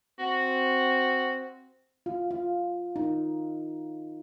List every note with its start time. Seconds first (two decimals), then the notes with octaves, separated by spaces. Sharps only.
0.19 C4 F#4
2.06 F4
2.31 F4
2.96 D#4